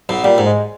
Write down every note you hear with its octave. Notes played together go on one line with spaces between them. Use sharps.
B1 B2
A#2 G3
G#2
G#3